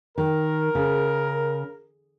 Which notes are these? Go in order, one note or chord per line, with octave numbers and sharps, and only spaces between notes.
D#3 A#4
C#3